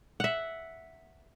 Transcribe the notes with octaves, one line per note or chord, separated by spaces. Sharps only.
E5 F#5